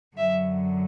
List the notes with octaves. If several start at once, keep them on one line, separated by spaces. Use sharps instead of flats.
F#2 D3 F#3 E5